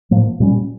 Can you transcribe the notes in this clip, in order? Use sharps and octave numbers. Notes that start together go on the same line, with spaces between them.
A2 F3 A#3
A#2 G3 C#4